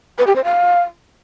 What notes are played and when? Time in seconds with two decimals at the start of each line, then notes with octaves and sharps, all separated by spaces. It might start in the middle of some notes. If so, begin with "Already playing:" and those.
0.18 B4
0.27 G4
0.35 C5
0.44 F5